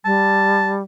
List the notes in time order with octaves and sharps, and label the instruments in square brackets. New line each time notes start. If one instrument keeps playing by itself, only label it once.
[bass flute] G3 [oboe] A5